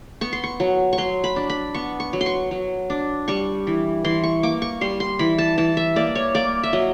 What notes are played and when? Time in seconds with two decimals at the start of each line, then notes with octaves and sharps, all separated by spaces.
0.21 B3 C#6
0.33 C6
0.44 C#6
0.60 F#3
0.93 C#6
0.98 F#3 C6
1.24 B5
1.36 D4
1.50 B5
1.74 B3 C#6
2.00 C#6
2.13 F#3
2.21 C6
2.26 C#6
2.51 F#3
2.90 D4
3.28 G3 C#6
3.67 E3
4.04 E3 C6
4.24 C#6
4.43 A#3 D6
4.62 C#6
4.81 G3 C6
5.00 C6
5.19 E3 B5
5.38 A5
5.58 E3 A5
5.77 E5
5.96 A#3 D5
6.15 C#5
6.35 A#3 D5
6.63 E5
6.73 F#3 D#5